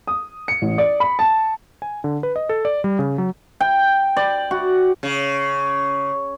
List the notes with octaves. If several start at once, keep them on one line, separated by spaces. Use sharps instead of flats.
D#6
C#7
A1
D5
B5
A5
G#5
D3
B4
D#5
A4
D5
G3
C#3
F#3
G5
D5
F#4
C#3